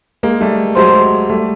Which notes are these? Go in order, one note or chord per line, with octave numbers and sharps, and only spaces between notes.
G#3 A#3
G3 A3
F#3 G#3 C5
G3 A3